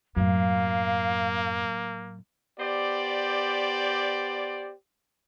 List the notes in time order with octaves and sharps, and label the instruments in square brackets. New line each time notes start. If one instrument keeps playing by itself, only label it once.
[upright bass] F#2 [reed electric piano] A2 F#3 [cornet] A#3 [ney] F5
[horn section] B3 G4 C5 D5